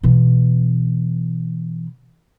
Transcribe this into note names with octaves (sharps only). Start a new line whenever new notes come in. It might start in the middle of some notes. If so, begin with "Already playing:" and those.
B2 E3